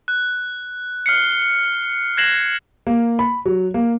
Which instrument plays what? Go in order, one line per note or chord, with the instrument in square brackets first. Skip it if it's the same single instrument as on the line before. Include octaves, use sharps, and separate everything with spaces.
[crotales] F#6
F6 C7 C#7
F#6 G#6 A#6 C7 E7 F#7
[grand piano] A#3
B5
F#3
A#3